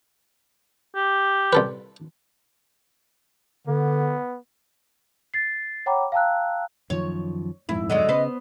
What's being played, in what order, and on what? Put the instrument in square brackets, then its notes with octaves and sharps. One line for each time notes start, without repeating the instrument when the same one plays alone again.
[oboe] G4
[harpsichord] C2 A4 B4
[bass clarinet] D3 [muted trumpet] B3
[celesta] A6 C7
C#5 F#5 G5 A#5 B5 D6
F5 G5 A5 A#5 E6 F#6
[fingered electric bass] F#2 D#3 F3 [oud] C#5
[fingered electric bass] D#1 F2 G#2 [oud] E4
[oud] D3 F#3 G#3 [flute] D#5
[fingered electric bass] C#3 [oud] B3 B4 C5